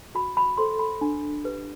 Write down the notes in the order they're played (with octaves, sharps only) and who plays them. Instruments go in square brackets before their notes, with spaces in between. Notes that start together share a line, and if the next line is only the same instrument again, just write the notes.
[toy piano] F#4 B5
B5
A4 C5 C6
B5
D4
G4 B4